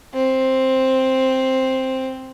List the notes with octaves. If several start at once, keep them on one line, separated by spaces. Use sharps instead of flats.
C4